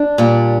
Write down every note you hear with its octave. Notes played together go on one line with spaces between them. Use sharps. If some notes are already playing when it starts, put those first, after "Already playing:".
Already playing: D4
A#2 G3